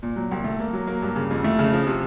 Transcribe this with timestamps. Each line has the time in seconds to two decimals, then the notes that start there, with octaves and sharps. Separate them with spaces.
0.03 A#2
0.16 F#3
0.31 C2
0.44 A3
0.60 A#3
0.73 F#3
0.87 A#3
1.02 G2
1.16 C#3
1.31 F2
1.44 A3
1.59 C#3
1.73 F3
1.87 C3